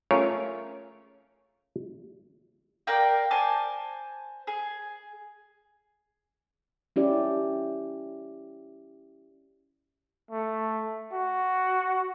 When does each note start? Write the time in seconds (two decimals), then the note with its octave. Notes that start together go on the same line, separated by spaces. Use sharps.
0.11 A3 C#4 F4 G#4 A#4 C#5
2.87 A#4 D5 F5 G5
3.31 C5 G#5 A5 D6
4.47 G#4
6.96 C#4 E4 G4 D5
10.31 A3
11.13 F#4